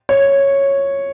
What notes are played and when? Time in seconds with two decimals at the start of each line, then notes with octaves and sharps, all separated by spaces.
0.09 C#5